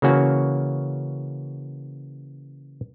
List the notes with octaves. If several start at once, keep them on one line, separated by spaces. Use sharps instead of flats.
C#3 E3 A#3 C#4 F#4